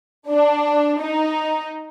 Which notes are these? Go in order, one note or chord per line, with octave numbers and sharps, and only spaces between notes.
D4
D#4